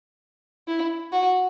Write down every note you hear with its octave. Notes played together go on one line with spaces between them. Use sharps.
E4
F#4